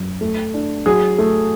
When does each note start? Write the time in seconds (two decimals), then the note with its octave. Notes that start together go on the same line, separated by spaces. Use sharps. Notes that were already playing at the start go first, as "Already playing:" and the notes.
Already playing: F#2
0.21 A3
0.54 D4
0.86 F#3 G#4
1.18 A3